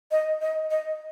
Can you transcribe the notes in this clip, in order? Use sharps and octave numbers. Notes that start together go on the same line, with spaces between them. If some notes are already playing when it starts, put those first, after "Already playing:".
D#5
D#5
D#5